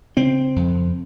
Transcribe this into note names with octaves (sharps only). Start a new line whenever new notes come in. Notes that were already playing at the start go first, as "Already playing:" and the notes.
C#3 C4
F2